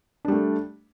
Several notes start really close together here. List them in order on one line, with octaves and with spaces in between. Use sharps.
D4 G3 A3